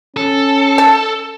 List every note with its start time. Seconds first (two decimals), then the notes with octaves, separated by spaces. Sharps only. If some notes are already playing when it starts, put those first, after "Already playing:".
0.17 C#4 A4
0.78 A5